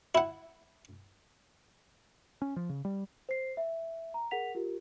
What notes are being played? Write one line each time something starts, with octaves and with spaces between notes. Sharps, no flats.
E4 F#5
C#4
F3
C#3
G3
C5 C7
E5
A#5
G#4 A#4 F#5 B6 F7
F4 G4 A#4